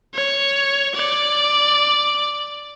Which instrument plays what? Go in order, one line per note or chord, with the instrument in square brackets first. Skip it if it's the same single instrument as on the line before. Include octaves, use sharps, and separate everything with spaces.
[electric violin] C#5
D5